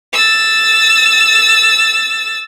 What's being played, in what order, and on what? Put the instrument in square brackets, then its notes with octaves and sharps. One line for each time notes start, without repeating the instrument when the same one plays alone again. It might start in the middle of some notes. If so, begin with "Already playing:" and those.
[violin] E6 A6